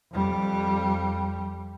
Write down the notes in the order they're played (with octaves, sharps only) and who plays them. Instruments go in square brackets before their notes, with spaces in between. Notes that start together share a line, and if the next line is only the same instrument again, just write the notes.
[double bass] F2 G3